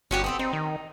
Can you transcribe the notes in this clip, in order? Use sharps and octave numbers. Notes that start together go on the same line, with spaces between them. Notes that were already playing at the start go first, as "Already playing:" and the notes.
G1 C#4 F#4 G4
B3 C4 A4
C4 D#4
D#3